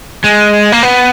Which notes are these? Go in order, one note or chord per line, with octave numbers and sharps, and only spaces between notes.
G#3
A#3
B3